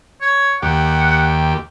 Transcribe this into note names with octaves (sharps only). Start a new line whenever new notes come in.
C#5
D#2 G4 F#5